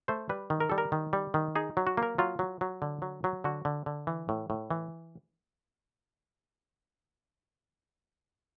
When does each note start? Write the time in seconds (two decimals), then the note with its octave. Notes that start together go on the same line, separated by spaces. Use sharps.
0.08 A3 C5
0.29 G3 B4
0.50 D#3
0.60 A#4
0.70 G3 A4
0.78 A#4
0.92 D#3
1.13 G3
1.34 D#3
1.56 D#4 G#4
1.77 F#3
1.87 F#4
1.97 A#3
2.03 A#4
2.18 F#3 F4
2.39 F#3
2.61 F#3
2.82 D3
3.02 F#3
3.24 F#3
3.44 D3 F#4
3.65 D3
3.86 D3
4.07 E3
4.29 A2
4.50 A2
4.70 E3